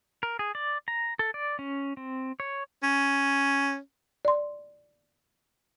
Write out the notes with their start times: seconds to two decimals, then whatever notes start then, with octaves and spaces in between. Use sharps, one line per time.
0.23 A#4
0.39 G#4
0.55 D5
0.88 A#5
1.19 A4
1.34 D5
1.59 C#4
1.97 C4
2.40 C#5
2.83 C#4
4.25 D5 C6